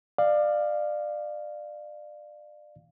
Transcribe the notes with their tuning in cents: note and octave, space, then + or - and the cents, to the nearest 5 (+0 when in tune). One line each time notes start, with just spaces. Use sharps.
D5 +25 F5 +0